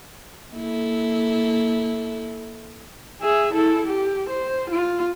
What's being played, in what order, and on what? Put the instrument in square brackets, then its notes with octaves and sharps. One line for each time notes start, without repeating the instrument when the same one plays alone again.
[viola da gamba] A#3 E4 A4
[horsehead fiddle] G#4 E5
E4 A4
G4
C5
F4